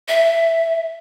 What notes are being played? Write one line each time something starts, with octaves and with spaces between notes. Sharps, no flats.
E5